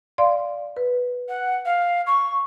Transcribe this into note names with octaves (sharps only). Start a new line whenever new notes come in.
D5 F5 C6
B4
F#5
F5
C#6